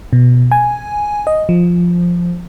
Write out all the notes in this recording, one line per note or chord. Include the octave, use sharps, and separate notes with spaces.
B2
G#5
D#5
F3